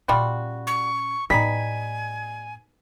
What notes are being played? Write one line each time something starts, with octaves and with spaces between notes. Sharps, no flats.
A#2 G3 C#4 F4 F#4
C#6
A2 G3 B3 D#4 G#5 B6